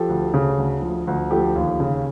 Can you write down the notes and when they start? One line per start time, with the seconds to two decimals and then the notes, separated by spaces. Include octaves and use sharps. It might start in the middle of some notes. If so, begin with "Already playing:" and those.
Already playing: F3 G4 A4
0.09 D2
0.34 C#3
0.58 D2
0.82 F3
1.07 D2
1.31 F3 G4 A4
1.56 D#2
1.80 C#3